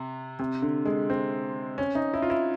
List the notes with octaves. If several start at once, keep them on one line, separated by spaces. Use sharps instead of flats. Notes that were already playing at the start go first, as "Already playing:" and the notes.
Already playing: C3
C3
D3
G#3
C4
C#4
D#4
E4
F4
E4